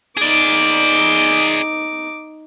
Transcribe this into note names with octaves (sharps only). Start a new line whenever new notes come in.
D#4 G#4 D5 D6